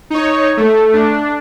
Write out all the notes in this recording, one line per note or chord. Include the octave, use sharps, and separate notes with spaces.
D#4 C#5
A3
D4